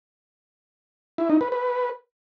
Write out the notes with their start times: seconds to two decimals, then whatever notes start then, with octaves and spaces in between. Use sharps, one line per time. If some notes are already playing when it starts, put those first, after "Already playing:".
1.18 E4
1.30 D#4
1.41 B4
1.52 B4